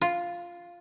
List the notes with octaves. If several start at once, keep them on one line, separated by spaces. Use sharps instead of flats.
F4